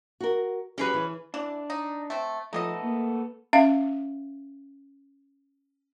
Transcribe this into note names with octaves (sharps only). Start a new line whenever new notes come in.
F#4 A#4
F#3 C#4 G4 G#4 B4
E3
E3 D4 D5
D#4
A3 C4
F3 A3 B3 D#4 G#4 A4 D#5
A#3
C#4 E5 F5